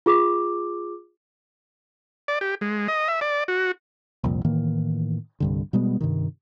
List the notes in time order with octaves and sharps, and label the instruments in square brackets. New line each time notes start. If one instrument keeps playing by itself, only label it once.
[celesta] F4 G#4 D6
[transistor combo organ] D5
G4
G#3
D#5
E5
D5
F#4
[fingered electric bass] C2 F2 A#2
A2 D#3 E3 A#3
C2 G2 D3
B2 G3 G#3 B3
G2 C3 D#3